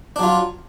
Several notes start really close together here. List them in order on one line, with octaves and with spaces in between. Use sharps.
D4 F#3 F4